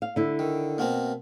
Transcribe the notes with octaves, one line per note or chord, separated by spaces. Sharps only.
F5
D3 E4
D#3
B2 A#3 C4